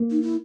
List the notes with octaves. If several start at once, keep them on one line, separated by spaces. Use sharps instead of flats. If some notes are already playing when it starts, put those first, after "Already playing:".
Already playing: A#3
D#4
E4